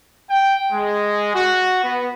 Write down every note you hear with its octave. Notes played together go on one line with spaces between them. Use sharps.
G5
G#3
F#4
B3